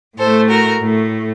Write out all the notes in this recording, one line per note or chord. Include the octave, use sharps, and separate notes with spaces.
A2 A3 A4 C5
F#4 A#4
A2 A3